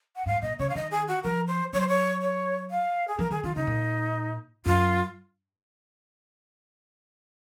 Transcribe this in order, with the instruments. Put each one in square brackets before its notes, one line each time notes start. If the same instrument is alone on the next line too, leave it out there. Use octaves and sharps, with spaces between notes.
[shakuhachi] F#5
[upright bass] G#2 [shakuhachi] F5
[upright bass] A#2 [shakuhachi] D#5
[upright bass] C#3 [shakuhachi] C#5
[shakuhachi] F5
[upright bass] D#3 [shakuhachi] D#5
[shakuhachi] G#4
F#4
[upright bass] F3 [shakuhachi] A#4
[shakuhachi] C5
[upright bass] F#3 [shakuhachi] C#5
[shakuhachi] C5
C#5
C#5
F5
G#4
[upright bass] F3 [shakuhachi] A#4
[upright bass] D#3 [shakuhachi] G#4
[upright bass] D#3 [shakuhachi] F4
[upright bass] C#3 [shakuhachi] D#4
[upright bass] A#2
[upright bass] F#2 [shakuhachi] F4